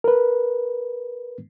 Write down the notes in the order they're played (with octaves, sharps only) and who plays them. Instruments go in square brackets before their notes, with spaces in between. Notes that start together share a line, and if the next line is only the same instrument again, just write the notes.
[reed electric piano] A#4 B4